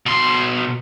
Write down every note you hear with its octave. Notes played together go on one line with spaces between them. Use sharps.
B2 C6